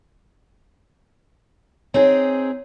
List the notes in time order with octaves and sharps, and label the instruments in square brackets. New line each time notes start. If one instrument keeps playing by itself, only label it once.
[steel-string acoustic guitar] C4 D#4 G#4 [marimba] C#5